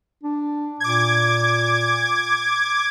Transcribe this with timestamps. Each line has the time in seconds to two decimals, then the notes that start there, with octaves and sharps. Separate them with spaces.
0.23 D4
0.80 A#2 D6 G#6